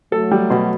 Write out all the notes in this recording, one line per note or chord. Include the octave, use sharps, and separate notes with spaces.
F#3 A3 A4
G3
B2